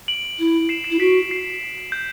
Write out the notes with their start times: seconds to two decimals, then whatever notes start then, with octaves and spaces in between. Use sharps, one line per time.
0.08 D7 F#7
0.39 E4
0.69 C7 E7
0.84 C7 E7
0.91 E4
0.99 F#4 B6 D7
1.31 C7
1.92 G6